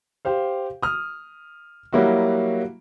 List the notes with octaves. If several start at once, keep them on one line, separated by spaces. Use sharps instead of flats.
G4 C5 F5
D#6 F6
F#3 G3 A#3 E4 F#4